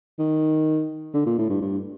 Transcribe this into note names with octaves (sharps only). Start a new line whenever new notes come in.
D#3
D3
A#2
A2
G2
G2